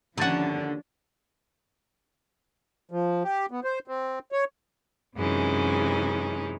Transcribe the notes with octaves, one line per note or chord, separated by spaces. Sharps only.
D#2 D3 F3 C#4 D4 F#4 A5
F3
G4
B3
C5
C4
C#5
F#2 C3 E3 G#3 C#4 D#4